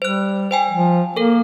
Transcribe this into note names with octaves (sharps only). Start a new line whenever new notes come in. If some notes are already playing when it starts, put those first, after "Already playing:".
G3 C5 F#6
C5 G5 G#5
F3
A#3 A4 A#4